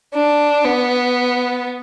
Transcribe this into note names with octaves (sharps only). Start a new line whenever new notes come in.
D4
B3